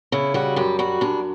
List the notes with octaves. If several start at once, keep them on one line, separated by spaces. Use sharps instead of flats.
C#3 E4
G3 F#4
F#2 G4
G3 F#4
F#2 D4